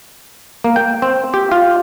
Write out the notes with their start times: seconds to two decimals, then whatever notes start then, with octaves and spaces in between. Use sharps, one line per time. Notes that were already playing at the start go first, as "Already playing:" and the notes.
0.64 A#3
0.76 G5
1.02 C4
1.34 G4
1.52 F4